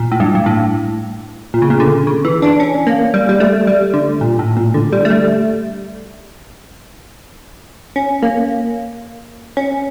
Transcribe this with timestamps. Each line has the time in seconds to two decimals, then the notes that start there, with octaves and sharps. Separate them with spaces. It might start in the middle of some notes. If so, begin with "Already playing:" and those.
Already playing: A#2
0.12 A2
0.20 G2
0.35 G2
0.46 A2
1.54 A#2
1.62 C#3
1.70 A#2
1.80 D3
2.07 C#3
2.25 E3
2.42 D4
2.60 C#4
2.87 A#3
3.14 G3
3.29 G3
3.40 A3
3.67 G3
3.94 D3
4.21 A#2
4.39 A2
4.57 A#2
4.74 D3
4.93 G3
5.05 A3
5.10 G3
7.96 C#4
8.23 A#3
9.57 C#4